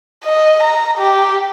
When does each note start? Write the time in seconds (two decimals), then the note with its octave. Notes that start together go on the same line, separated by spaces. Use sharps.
0.25 D#5
0.63 A#5
0.98 G4